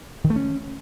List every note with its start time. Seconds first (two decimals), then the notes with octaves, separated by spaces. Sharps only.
0.24 D#3
0.30 A3
0.36 C#4